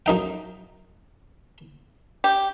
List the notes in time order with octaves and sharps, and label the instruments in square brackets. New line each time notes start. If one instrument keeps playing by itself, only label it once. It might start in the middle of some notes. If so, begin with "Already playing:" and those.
[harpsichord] F#2 D#4 G5
[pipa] G4